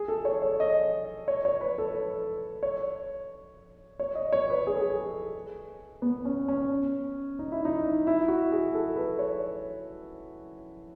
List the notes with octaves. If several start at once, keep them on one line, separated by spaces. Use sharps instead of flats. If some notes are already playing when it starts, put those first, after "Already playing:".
Already playing: G#4
A4
C#5
C#5
D#5
C#5
C#5
B4
A4
B4
C#5
C#5
D#5
C#5
B4
G#4
A4
G#4
B3
C#4
C#4
D#4
E4
D#4
E4
F#4
G#4
A4
B4
C#5